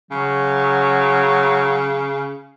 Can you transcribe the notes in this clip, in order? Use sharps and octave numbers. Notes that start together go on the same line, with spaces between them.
C#3 F#3